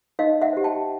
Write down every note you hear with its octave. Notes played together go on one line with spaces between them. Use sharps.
D#4 D#5 F5
E5 F#5
G4 C5
G5 A5